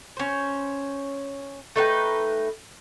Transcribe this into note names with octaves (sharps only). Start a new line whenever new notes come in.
C#4 C5
A3 D#4 B4 G5